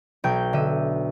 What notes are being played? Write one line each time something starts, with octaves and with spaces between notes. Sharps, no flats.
B1 G5 G6 G#6
D3 E5 D#7